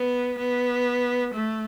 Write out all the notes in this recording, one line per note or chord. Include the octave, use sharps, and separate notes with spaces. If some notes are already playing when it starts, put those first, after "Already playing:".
Already playing: B3
B3
A3